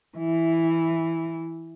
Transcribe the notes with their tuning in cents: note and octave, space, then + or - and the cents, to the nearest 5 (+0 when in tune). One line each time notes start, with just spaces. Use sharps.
E3 +0 E4 +0